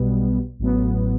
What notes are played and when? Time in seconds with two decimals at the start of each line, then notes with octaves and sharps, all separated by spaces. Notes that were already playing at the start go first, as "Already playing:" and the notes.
Already playing: B1 B2 G3 B3
0.59 A1 A2 F#3 B3